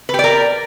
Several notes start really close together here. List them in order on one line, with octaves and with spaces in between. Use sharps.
B4 G4 D5 A#4